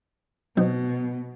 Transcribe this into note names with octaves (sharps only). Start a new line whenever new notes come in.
B2 F#3 B3 C4 D#4